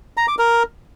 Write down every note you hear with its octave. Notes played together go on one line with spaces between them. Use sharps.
A#5
D6
A#4